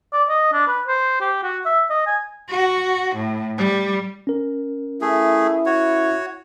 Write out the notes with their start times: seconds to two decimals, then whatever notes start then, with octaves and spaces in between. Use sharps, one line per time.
0.13 D5
0.29 D#5
0.53 D4
0.67 B4
0.87 C5
1.20 G4
1.43 F#4
1.65 E5
1.90 D#5
2.07 G#5
2.50 F#4
3.15 A2
3.58 G3
4.27 C#4 A#4
5.01 A3 E4 G#4
5.66 F#4 C#5